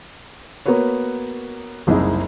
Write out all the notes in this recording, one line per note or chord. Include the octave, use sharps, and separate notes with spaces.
A#3 B3 F#4 A#4 B4 C#5
F#1 C2 D#4 E4 G#4